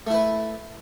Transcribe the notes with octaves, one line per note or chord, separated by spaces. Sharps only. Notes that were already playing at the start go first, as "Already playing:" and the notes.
A3 E4 B4